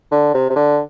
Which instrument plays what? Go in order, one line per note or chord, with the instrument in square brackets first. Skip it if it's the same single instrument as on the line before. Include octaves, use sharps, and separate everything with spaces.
[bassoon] D3
C3
C3
D3